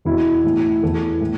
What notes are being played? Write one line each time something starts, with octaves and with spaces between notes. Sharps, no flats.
E2 B2 E4
A2 E3
E2 E3 A4
A2